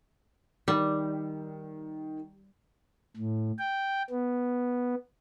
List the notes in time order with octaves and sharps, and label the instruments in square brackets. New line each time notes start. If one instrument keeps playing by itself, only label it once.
[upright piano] D#3 [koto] G3
[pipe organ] A2
G5
B3